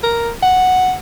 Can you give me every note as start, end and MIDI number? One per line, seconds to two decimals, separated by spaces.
0.03 0.31 70
0.42 0.94 78